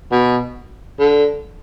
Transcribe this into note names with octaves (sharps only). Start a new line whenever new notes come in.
B2
D3